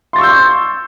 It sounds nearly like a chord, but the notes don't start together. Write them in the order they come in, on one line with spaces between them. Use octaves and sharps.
C6 A6 C#6 E6 G6